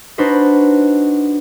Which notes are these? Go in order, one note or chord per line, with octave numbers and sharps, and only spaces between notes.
D4 D#4 F#4 B4 C5 D#5